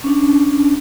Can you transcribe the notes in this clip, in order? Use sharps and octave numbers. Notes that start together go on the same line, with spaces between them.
C#4 D4